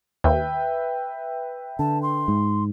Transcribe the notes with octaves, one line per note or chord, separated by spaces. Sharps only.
D#2 B4 E5 G5
D3 A5
C6
G#2